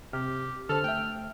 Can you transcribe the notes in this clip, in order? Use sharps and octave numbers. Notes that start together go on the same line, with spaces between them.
C3 G4 F6
D3 A4 C5 A5 F6
A3 E5 G5